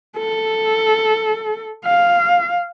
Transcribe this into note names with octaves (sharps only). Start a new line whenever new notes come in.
A4
F5